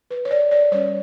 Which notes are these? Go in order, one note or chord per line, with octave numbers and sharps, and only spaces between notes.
B4
C#5
D5
D5
G3 C#4 C#5